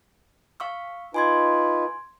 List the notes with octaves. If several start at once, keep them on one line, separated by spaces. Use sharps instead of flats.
F5 C#6 E6
D#4 F4 B4 G#5 C6 G#6